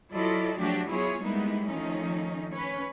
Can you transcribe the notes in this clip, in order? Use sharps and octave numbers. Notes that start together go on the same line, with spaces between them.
F#3 E4 F4 A4 D5 D#5
F3 F#3 A3 D4 F#4 G4
F#3 B3 E4 F4 G#4 C#5
G3 G#3 A#3 B3 D#4 E4
D#3 F3 A3 C#4 D#4
C#4 B4 C#5